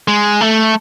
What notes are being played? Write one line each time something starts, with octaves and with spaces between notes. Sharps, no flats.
G#3
A3